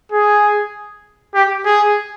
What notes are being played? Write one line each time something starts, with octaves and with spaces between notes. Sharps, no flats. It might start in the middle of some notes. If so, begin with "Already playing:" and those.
G#4
G4
G#4